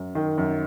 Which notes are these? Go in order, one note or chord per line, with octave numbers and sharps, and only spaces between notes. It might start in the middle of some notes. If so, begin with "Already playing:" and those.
Already playing: F#2
D#3
F#2